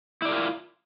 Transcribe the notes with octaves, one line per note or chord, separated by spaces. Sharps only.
E4 F4 A#4 D5